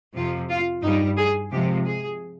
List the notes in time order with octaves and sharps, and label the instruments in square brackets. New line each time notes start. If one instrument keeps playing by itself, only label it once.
[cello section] F2 C3 F3 F4
F4
G2 G3 D#4
G#4
C3 F3 G#3 G4
G#4